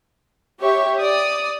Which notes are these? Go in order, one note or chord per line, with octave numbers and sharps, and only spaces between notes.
G4 C#5 E5 C#6
D5 D#6